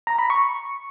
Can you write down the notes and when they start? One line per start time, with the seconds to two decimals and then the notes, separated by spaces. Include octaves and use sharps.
0.07 A#5
0.18 B5
0.30 C#6